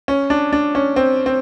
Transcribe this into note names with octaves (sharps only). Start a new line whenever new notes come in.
C#4
D4
D4
C#4
C4
C4